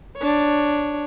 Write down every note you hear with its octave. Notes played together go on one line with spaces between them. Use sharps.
D4 C#5